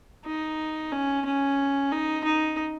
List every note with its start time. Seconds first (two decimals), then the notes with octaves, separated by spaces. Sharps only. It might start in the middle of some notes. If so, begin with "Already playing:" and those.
0.25 D#4
0.92 C#4
1.26 C#4
1.92 D#4
2.24 D#4